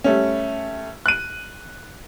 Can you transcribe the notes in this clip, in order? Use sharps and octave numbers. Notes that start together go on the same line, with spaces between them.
G3 A3 C#4
F#6 D#7